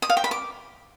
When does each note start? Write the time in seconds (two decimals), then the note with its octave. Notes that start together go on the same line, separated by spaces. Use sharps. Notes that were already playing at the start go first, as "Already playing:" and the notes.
0.02 D#6
0.10 F5
0.17 G5
0.24 B5
0.31 D6